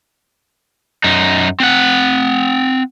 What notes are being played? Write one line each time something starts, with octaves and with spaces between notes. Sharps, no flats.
F#2 D#4
C4 F#5